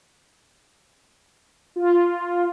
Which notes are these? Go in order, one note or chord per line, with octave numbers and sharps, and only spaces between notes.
F4